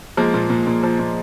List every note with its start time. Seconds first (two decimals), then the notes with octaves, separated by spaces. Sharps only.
0.17 F3 G#3 A#3
0.34 A#2
0.50 A#2
0.67 A#2
0.83 F3
0.99 A#2